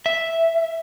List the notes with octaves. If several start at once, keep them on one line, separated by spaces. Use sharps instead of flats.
E5